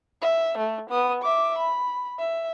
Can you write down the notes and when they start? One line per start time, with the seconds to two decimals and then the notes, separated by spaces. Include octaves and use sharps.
0.22 E5
0.58 A3
0.90 B3 D#6
1.22 E5 D6
1.58 B5
2.19 E5